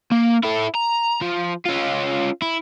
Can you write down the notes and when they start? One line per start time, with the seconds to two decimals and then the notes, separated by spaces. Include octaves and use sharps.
0.11 A#3
0.44 E4 A4
0.75 A#5
1.21 F3
1.65 C#4 F4
2.42 E4